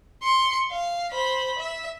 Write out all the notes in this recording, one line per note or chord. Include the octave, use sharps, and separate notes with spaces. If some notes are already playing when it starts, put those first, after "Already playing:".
C6 C#7
F5
C5 B5
E5